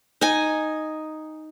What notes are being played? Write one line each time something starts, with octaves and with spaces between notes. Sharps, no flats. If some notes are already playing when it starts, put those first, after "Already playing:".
D#4 G#5